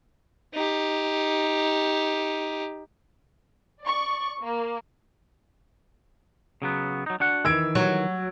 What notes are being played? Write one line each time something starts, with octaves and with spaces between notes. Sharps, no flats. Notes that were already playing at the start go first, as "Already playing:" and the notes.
D#4 G4
D5 C#6
A#3
C#3 F#3 B3
F#3 D#4
D4 F#4 F#5
D#3 E3 E6 G#6 D7
F#3